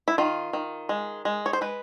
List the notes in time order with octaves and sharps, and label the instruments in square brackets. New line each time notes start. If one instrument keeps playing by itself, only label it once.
[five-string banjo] E4
D#3 F4
D#3
G#3
G#3
C#5
C5
G#3 B4